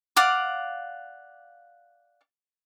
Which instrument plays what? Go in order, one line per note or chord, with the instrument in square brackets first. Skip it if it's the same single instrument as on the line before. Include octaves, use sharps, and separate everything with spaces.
[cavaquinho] D5 F5 F#5 D6